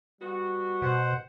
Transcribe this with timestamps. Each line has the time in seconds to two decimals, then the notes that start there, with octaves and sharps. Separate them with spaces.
0.21 G3 B3 F#4
0.82 B2 C5 F#5